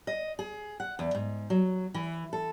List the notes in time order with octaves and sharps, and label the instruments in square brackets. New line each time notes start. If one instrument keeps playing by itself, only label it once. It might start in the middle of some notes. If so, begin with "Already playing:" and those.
[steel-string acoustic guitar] D#5
G#4
F#5
E2
G#2
F#3
E3
A4